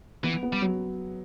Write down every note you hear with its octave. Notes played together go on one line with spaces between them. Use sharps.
E3 B3
B3
G3
F#3